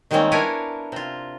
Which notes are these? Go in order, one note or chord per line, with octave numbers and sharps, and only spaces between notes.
D#3 G3 G#3 A#3 C4 C#4
B3 D4 E4 A#4 C#5 G#5
C3 F4